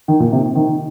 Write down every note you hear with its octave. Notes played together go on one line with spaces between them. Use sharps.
D#3
A#2
C3
D#3